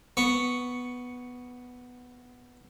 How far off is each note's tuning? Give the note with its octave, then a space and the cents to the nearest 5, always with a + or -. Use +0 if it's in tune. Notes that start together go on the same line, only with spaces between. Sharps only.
B3 +0 C#6 +0